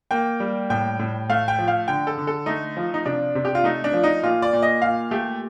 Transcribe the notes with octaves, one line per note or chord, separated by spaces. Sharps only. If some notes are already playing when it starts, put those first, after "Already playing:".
A#3 G5
G3
A2 G5
A2
A3 F5
G5
F3
F5
D3 G5
A4
D3
A4
A3 D#4
F3
D#4
C3 D4
C3
G4
F4
A3 D#4
D4
F3
D#4
A#2 F4
D5
A#2
D#5
A#2 F5
A3 G4